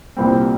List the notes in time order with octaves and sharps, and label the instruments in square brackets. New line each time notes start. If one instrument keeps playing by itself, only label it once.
[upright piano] C2 A#2 G3 C4